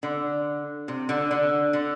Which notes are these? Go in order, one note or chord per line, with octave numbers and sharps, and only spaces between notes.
D3
C3
D3
D3
D3